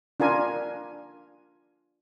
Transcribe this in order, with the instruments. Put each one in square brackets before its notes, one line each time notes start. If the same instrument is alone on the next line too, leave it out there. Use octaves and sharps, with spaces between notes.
[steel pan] D4 F4 A#4 G#5